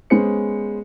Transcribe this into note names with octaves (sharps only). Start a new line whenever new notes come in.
G#3 B3 C#4 G#4 C5 C#7